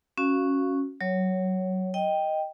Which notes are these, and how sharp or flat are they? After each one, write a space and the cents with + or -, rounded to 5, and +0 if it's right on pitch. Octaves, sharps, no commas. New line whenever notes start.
C#4 -5 F#4 +0 F5 +0
F#3 +20 C#5 +0
D#5 +0 G5 +0